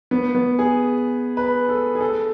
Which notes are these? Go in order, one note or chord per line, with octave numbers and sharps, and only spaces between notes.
B3
B3
G#4
B4
A4
G#4
A4